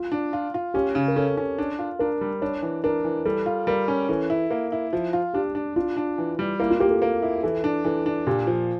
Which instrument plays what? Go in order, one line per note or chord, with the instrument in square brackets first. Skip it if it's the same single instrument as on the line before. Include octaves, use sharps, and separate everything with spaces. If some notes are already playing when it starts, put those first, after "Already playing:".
Already playing: [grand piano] F4
[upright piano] D4
F4
F4
[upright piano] C#4 [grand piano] G4
[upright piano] C#3
[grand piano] A#4
[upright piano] C#4 [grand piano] A4
[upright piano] C#4
D4
F4
[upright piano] D4 [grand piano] A#4
[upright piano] G3
[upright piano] D4 [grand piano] C#5
[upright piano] E3
[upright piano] D4 [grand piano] A#4
[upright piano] E3
[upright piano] G3 [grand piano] A4
[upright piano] F4
[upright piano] G3 [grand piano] A#4
[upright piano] C#4
[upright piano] E3 [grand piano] A4
[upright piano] E4
A#3
E4
F3
F4
[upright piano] D4 [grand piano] G4
[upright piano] D4
[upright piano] D4 [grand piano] F4
[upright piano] D4
E3
G3
[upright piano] A#3 [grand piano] E4
[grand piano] F4
[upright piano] A#3 [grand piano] G4
[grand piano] A4
[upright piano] A#3
E4
[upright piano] E3 [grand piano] A4
[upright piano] D4
[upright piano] E3 [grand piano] A4
[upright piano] D4
[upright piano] A#2 [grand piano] G4
[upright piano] F3